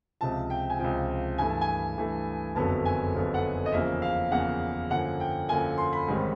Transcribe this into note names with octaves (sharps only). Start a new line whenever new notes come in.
C#2 C3 F3 A5
G5
G#5
C#2 C3 F3 G5
G2 E3 A3 G#5
A5
G#5
G2 E3 A3
F#1 F2 D3 F#3 B3 A5
G#5
F#1 F2 D3 F#3 B3
F#5
D#5
E2 C#3 F3 A#3 E5
F5
E2 C#3 F3 A#3 F#5
F#2 D3 F3 A#3 F#5
G5
F#2 D3 F3 A#3 G#5
C6
B5
A1 G#2 D#3 G3 C4